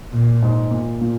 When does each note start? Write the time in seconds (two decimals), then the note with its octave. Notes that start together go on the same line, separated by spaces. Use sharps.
0.13 A#2
0.42 G#2
0.71 A#2
1.01 A#2